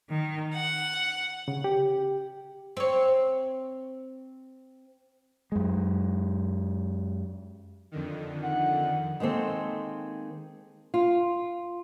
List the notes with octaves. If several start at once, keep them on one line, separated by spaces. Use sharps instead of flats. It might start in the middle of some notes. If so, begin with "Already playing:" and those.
D#3
F#5
C#3
G4
C4 C#5
F#2 G#3
F2 D3 D#3
F#5
D#3 G#3 A#3 C4 A4
F4